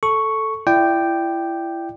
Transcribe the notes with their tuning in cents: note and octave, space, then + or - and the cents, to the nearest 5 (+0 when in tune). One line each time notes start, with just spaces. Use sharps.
A4 +0 C#6 +0
E4 +30 D5 +15 G5 -5